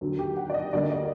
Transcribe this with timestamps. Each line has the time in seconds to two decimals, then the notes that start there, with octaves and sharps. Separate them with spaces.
0.01 D#2 D3 F#3
0.19 G4
0.37 F#5
0.50 D5
0.54 D#5
0.73 D2 D3 G3 A#3 D5
0.83 D#5
0.92 D5